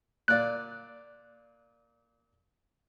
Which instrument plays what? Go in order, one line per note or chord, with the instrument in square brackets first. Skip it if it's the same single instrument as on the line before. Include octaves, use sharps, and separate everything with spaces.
[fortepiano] A#2 D5 [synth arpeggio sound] F#6